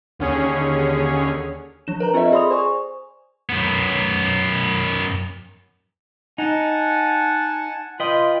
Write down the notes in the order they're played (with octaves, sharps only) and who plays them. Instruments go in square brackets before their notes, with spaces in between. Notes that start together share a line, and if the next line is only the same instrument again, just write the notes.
[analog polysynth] D#2 D3 C#4 G#4 C#5
[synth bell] F3 D4 E7
A#4 B4 A#5
C4 F4 A4 C5 D#5 E5
G#4 D5 B5 C6 D#6 F7
C5 G#5 C#6
[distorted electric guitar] F#2 B3
[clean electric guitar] D#4 [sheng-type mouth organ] F#5 G#5 A5
[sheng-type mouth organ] F4 G5 [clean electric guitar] B4 D#5